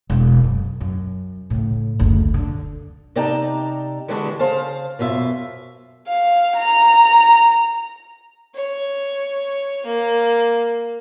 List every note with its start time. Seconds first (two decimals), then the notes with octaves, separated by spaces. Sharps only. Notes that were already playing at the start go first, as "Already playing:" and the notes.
0.10 E1 E4
0.44 F#2
0.80 F#2
1.50 A2 C#3
1.99 F#1 D2
2.34 D3
3.16 C3 D#4 D5 G5 A5 A#5
4.08 D3 E3 G3 G#3 D4 F#4
4.39 C#3 C5 F5 A5
4.99 F#2 B2 F4 E5
6.08 F5
6.56 A#5
8.55 C#5
9.86 A#3